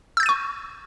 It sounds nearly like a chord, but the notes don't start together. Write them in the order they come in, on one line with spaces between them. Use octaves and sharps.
E6 G6 A6 D#7 C#6